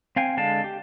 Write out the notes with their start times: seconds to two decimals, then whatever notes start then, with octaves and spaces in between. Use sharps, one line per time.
0.16 C4 F5 G5 G#5
0.37 D3 G#3 D5 F5 A5
0.64 G4